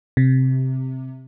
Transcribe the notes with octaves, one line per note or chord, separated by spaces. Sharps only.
C3